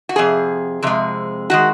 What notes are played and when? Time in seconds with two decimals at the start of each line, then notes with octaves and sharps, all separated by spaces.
0.09 F#4
0.16 F2 C3 G#4
0.83 F2 C3 G#3
1.50 D#3 G#3 F#4